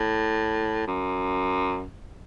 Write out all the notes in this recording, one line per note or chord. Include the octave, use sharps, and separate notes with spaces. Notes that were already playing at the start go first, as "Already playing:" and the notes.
Already playing: A2
F#2